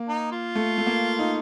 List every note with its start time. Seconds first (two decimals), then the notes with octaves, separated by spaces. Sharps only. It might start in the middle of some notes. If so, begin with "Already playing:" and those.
Already playing: A#3
0.08 D#4
0.31 F4
0.55 A3
0.78 A3
0.87 A#3
1.19 D#4